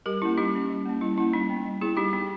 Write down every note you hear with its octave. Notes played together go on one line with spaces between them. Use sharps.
G3 G4 A#4
A#3 C#4 E4
G3 D#4 G4
A#3 C#4
G3
A#3 C#4
G3 E4
A#3 C#4 E4
G3 D#4
B3
G3
B3 E4 G#4
G3 D#4 G4
B3 D#4